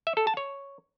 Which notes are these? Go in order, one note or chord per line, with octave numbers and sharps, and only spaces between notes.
E5
A4
A5
C#5